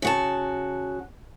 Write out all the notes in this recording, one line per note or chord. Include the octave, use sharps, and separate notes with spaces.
C#3 F#4 A5